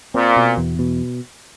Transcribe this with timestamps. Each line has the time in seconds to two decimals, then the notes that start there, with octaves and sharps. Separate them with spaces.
0.14 A#2 C4
0.36 B2
0.57 E2
0.79 B2